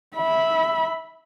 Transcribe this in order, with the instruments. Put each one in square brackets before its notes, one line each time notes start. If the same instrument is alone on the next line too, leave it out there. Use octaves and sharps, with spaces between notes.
[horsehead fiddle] E5 B5